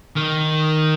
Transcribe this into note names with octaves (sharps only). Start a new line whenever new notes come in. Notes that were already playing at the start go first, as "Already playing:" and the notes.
D#3